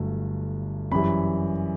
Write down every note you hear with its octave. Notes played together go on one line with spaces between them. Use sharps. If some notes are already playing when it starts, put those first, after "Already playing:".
Already playing: G1 G2 F#3 A3
F#2 E3 G3 B5